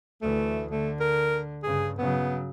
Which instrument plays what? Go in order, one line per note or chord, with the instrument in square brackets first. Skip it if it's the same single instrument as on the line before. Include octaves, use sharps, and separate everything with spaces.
[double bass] D2 E3 [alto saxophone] A3
[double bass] D3 [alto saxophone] A3
[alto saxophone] A#4
[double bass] G2 C#3 [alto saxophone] G#4
[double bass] C#3 F#3 [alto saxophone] B3